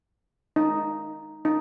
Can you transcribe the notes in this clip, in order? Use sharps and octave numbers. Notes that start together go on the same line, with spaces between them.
D#4
D#4